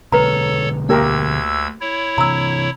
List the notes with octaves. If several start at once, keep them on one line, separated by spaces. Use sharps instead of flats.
B2 D3 G#3 A4 B4 C#5 A#5
D2 A#3 G4 A#4 E6 G#6
E4 C#5
C3 E3 A#5 E6